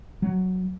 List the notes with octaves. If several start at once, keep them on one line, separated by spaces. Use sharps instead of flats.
F#3